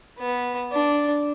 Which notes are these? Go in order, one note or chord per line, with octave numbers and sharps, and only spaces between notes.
B3
D4